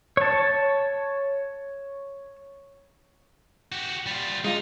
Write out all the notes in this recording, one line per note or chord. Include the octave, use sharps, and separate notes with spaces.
C#5 A5
F#4 G4
G3 F4
G#3 D#4 F4